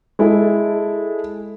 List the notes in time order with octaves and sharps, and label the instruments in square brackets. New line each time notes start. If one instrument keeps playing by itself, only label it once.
[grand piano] G#3 E4 A4